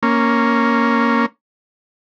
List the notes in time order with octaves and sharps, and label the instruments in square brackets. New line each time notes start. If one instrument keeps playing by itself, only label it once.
[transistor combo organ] A#3 C#4